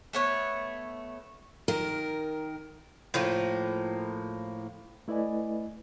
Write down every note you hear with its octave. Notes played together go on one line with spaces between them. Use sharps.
A3 B3 C#5
D#3 A#4
A2 F3 A#3
A3 E4 B4 D5 D#5 G#5